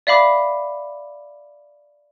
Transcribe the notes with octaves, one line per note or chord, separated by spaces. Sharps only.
D5 E5 F5 B5 D6